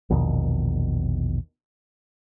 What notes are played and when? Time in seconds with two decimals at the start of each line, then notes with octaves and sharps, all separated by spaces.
0.10 A#1 E2 B2 D#3